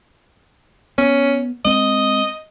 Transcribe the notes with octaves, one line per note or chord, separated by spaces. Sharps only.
B3 C#4
G#3 C4 D#5